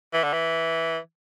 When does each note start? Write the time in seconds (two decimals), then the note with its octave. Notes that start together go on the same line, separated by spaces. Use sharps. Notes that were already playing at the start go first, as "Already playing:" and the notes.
0.14 E3
0.24 D3
0.33 E3